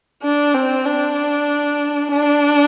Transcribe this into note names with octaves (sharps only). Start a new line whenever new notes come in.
D4
C4
D4
D4